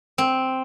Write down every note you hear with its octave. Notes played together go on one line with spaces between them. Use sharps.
C4